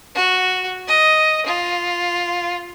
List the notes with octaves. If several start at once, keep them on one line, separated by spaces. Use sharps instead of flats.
F#4
D#5
F4